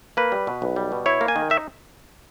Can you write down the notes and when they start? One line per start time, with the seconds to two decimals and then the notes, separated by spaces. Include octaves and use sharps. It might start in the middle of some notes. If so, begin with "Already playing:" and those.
0.17 A#3 B4
0.32 G3
0.47 B2
0.62 B1
0.76 G3
0.92 B2
1.06 E4 C#5
1.21 A#3
1.28 G#5
1.36 D#3
1.50 D#4 E5